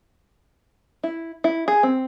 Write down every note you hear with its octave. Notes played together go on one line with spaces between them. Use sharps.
E4
E4
G#4
C4